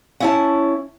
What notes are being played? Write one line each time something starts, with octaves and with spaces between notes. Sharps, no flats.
C#4 E4 A5